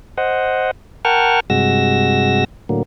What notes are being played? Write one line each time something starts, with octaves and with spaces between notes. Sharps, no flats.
C5 D#5 F#5
A#4 F#5 G5 A5 C#6 F6
G2 C3 G#3 F#4 E6 A#6
A2 D3 F#3 A#3